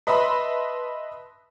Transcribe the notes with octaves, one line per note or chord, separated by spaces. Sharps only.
B4 D#5 E5 A5 B5 C6